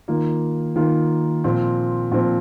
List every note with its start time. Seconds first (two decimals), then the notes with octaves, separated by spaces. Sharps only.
0.08 D#3 A#3 F4
0.76 D#3 A#3 F4
1.44 A#2 F3 C4
2.11 A#2 F3 C4